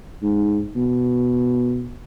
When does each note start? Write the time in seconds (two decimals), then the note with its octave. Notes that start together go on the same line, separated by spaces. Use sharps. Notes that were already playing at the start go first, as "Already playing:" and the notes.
0.22 G#2
0.76 B2